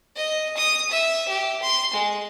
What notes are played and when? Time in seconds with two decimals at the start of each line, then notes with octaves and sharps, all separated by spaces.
0.16 D#5
0.57 D#6
0.91 E5
1.28 G4
1.62 C6
1.93 G#3